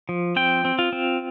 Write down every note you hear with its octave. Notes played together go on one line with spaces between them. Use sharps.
F3
C4 G5
C4
F4
C4